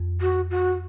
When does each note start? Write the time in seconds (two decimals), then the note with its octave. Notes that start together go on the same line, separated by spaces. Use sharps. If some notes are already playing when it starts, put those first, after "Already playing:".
Already playing: F2
0.21 F#4
0.50 F#4